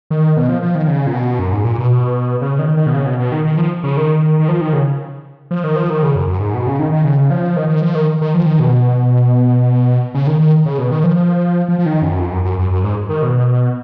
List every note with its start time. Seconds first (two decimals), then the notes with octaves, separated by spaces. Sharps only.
0.10 D#3
0.37 B2
0.49 F3
0.62 F3
0.75 D#3
0.88 C#3
1.07 A#2
1.13 B2
1.39 F#2
1.53 G#2
1.64 A#2
1.78 B2
2.41 C#3
2.59 D#3
2.77 D#3
2.87 B2
2.94 C#3
3.06 B2
3.19 B2
3.32 D#3
3.45 D#3
3.57 F3
3.84 C#3
3.97 D#3
4.39 D#3
4.48 F3
4.61 D#3
4.73 C#3
5.51 F3
5.64 D#3
5.76 F3
5.90 D#3
6.03 C#3
6.16 F#2
6.27 F#2
6.40 G#2
6.54 B2
6.67 C#3
6.79 D#3
6.92 D#3
7.04 C#3
7.30 F3
7.56 D#3
7.69 D#3
7.82 F3
7.95 D#3
8.21 D#3
8.34 F3
8.46 D#3
8.60 B2
10.14 C#3
10.27 D#3
10.40 D#3
10.66 C#3
10.78 B2
10.91 D#3
11.04 F3
11.68 F3
11.79 F3
11.86 D#3
12.02 F#2
12.19 F2
12.32 F#2
12.45 F#2
12.59 F#2
12.71 F#2
12.83 G#2
13.09 D#3
13.22 B2